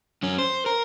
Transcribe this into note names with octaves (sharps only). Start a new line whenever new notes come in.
F#2 C#4
C5
A#4